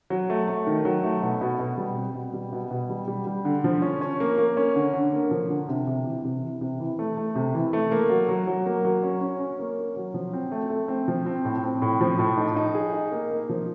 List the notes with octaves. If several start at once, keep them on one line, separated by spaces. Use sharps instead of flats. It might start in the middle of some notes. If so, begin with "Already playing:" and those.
F#3
A3
A3
D#3
F#3
A3
B2
B2
B2
G3
C4
B2
G3
B2
B2
G3
G3
G3
D3
F3
C#4
C#4
A#3
A#3
C#4
D3
D3
A#3
F3
D3
C3
C3
E3
C3
E3
C3
E3
A3
A3
C3
E3
A3
A#3
F#3
F#3
F#3
A#3
F#3
C#4
C#4
C#4
A#3
C#4
F#3
F3
C4
A3
A3
C4
F3
C4
A2
C4
A2
F3
A2
D#4
D#4
G#4
D#4
A#3
A#3
F3